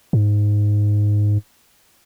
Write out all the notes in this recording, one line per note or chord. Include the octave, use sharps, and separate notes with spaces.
G#2